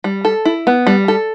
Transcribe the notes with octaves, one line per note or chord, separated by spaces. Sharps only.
G3
A4
E4
B3
G3
A4